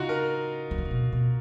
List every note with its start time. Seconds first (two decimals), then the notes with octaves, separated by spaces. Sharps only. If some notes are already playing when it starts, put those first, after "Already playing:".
Already playing: C#3 D#4 F4 F#4
0.09 A#4
0.71 F3
0.78 D#3
0.85 C#3
0.91 B2
1.12 B2